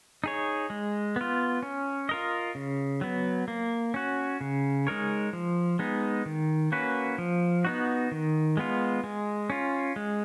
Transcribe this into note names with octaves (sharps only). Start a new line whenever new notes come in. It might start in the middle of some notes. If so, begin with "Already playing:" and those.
D#4 G#4 C#5
G#3
B3 F4
C#4
F4 A#4 D#5
C#3
F#3 B3
A#3
C#4 F#4
C#3
G#3 D#4 A#4 C#5
F3
G#3 B3 D#4
D#3
A#3 C#4 F#4 B4
F3
B3 D#4 F#4
D#3
G#3 B3 F4
G#3
C#4 F4
G#3